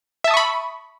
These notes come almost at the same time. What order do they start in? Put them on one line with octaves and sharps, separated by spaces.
E5 A5 D#6 C#6 B5